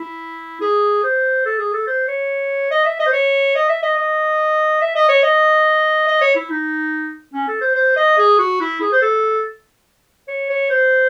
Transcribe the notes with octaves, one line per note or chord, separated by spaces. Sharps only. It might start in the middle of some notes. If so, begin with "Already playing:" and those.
Already playing: E4
G#4
C5
A4
G#4
A4
C5
C#5
D#5
E5
D#5
C5
C#5
D#5
E5
D#5
D#5
E5
D#5
C#5
D#5
D#5
C#5
E4
D#4
C#4
A4
C5
C5
D#5
G#4
F#4
E4
G#4
C5
A4
C#5
C#5
C5